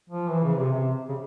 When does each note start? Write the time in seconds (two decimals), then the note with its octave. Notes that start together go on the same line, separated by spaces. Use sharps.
0.10 F3
0.30 E3
0.44 C#3
0.58 C3
0.72 C3
1.09 C#3